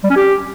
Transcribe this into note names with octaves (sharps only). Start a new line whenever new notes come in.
G3
C#4
G4